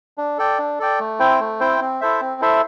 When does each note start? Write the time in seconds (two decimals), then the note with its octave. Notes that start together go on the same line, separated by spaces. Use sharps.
0.18 D4
0.38 A4 D5 G5
0.59 D4
0.79 A4 D5 G5
1.00 A3
1.19 C4 E4 C5 G5
1.40 A3
1.60 C4 E4 C5 G5
1.81 C4
2.01 E4 A4 C5 E5
2.21 C4
2.41 E4 A4 C5 E5